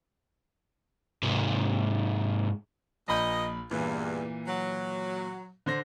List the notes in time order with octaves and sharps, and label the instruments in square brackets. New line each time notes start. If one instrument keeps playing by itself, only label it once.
[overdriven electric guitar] G#2 C3
[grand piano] A#1 B5 G6 [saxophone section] A#2 D#5
[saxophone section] E2 G2 [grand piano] A#2 E3
[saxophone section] F#3
[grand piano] D3 C5 A#6